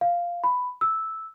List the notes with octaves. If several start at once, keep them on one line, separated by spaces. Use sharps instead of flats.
F5
B5
E6